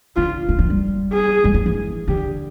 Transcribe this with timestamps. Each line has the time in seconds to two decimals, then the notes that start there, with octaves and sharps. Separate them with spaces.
0.16 D3 F4
0.49 D#3
0.59 E3
0.70 G3
1.13 G#4
1.44 G3
1.54 F3
1.66 E3
2.08 D3 G4